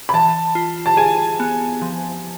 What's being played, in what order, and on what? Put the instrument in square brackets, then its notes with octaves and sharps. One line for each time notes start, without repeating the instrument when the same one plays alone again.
[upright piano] B5
[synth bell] E3 [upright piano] A5
[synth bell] F4
[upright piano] A5
[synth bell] G#4 [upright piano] G#5
[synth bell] B3
F3